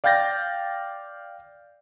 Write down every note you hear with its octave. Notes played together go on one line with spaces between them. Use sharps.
D5 F5 G5 G6 A6 A#6